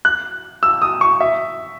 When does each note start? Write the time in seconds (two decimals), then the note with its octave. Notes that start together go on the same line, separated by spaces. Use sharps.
0.05 F#6
0.63 E6
0.82 D#6
1.01 C#6
1.20 E5